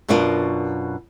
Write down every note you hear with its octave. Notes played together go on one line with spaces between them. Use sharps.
F#2 B2 B3 D4 F4 A#4